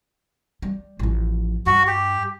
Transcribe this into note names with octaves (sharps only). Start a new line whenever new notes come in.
G3
A1 F3
G2 F#4
G4